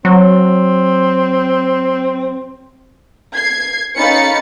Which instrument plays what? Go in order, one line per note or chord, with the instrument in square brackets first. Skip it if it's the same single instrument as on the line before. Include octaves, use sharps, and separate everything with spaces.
[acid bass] F#3 [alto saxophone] C4
[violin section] G#6 C7
C#4 D#4 F5 B5 A6 C#7